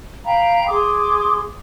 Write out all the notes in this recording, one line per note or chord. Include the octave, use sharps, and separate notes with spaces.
F5 G5 A#5 B5
G#4 C6 D6 D#6